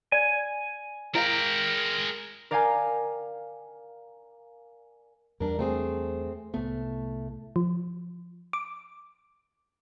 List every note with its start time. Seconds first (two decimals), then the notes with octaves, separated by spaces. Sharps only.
0.12 D5 G#5
1.15 G#3 E4 A#4 F5 G5
2.51 A#4 D5 F5 G5 G#5 A#5
5.40 E2 G3 D4 A#4
5.59 A3 C4 G#4
6.54 C2 A2 A3 B3
7.56 F3
8.53 D6